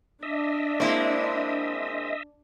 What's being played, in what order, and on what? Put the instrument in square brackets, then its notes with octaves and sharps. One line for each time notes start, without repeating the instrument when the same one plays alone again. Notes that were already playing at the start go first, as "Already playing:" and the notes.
[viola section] D4 [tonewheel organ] D#5 E5
[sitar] G#3 C4 [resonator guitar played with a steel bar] A#3 E4